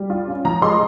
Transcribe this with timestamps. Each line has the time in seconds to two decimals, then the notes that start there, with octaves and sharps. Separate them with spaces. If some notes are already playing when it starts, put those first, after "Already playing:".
Already playing: G3
0.10 F4
0.28 C#4
0.45 F3 A#5
0.62 G#3 C6